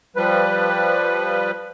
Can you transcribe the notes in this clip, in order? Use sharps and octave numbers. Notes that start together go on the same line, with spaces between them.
F3 G3 B4